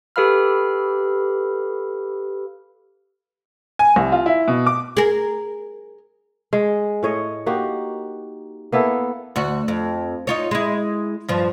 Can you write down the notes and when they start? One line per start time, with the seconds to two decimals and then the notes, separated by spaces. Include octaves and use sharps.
0.16 G4 A4 B4 F5 B5 F6
3.79 G#5
3.96 C2
4.12 F4
4.26 E4
4.48 B2
4.67 D6
4.97 G#4 A#4
6.53 G#3
7.03 A2 C#5 D#5
7.46 A#3 D#4 F#4 G4
8.72 A#3 B3 E4 A4
9.36 D2 F#4
9.68 F2
10.27 D#4 F4 C#5
10.51 G#3 E4
11.28 G2 F3